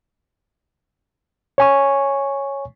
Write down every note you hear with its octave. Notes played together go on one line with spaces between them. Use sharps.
C#5 G#5 C#6